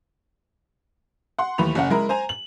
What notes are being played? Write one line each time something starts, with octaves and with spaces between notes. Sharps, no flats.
F#5 C6
D#2 E3 A3 B5 F7
F#1 C#4 F#5
G#3 E4 A#4 B5
C5 G#5 A#5
F#7